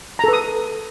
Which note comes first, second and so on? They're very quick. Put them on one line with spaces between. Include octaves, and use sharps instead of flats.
A#5 A4 B4 D#6